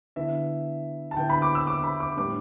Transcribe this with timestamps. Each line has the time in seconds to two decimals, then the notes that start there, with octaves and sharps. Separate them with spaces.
0.16 D3 B3 E4 E5
1.11 A5
1.17 D3 B3 E4 G5
1.30 B5
1.42 D6
1.55 E6
1.67 D6
1.84 B5
2.00 D6
2.17 A2 G3 B3 D4 D6